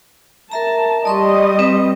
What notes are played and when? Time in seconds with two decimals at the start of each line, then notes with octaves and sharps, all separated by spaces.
0.52 A#4 E5 A5 A#5
1.05 G3 D5 D#5 C6 C#6
1.59 C4 B4